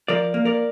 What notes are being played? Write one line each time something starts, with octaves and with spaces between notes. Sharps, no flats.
F3 A#4 D5
A#3
A#4 D5